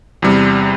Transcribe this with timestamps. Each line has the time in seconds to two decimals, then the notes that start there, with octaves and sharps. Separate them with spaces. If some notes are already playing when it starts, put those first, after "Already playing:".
0.22 E2 C3 G3